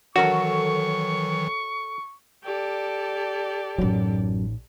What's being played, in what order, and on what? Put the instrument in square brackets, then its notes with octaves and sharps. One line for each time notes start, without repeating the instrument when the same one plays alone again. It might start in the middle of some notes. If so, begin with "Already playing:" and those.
[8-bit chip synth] D#3 E3 F#3 [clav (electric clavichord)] F#4 [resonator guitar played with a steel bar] A4 A#4 C#5 [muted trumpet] C#6
[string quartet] G4 A4 D5
[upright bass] A1 D#4 [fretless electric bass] F#2 F#3